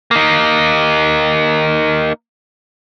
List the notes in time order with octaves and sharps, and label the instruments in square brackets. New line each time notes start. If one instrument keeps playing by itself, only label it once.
[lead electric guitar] A#3 D#4